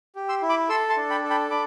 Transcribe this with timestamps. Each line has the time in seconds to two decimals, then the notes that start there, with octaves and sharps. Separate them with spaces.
0.15 G4
0.29 C6 E6
0.42 E4
0.49 B5 D6
0.69 A4 C6 E6
0.90 A5 C6
0.97 D4
1.10 G5 B5
1.24 A4
1.30 G5 B5
1.50 D4 B5 D6